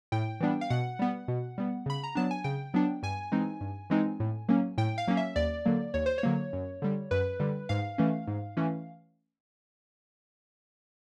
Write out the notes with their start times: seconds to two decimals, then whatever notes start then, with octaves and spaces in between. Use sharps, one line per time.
0.12 A2 G5
0.40 E3 G3 B3 D4
0.61 F5
0.70 B2 F#5
0.99 G3 B3
1.28 B2
1.58 G3 B3
1.86 C#3 B5
2.03 A#5
2.15 F#3 B3 D4 A5
2.31 G#5
2.44 C#3 G5
2.74 F#3 B3 D4
3.03 G2 G#5
3.32 E3 G#3 C4 D#4
3.61 G2
3.90 E3 G#3 C4 D#4
4.20 A2
4.49 F#3 A#3 C#4
4.78 A2 G5
4.98 F5
5.08 F#3 A#3 C#4
5.17 E5
5.36 D#2 D5
5.66 D3 F#3 A#3
5.94 D#2 C#5
6.06 C5
6.18 C#5
6.23 D3 F#3 A#3
6.53 F#2
6.82 D3 G3
7.11 F#2 B4
7.40 D3 G3
7.69 G#2 F5
7.98 E3 A3 C#4
8.27 G#2
8.57 E3 A3 C#4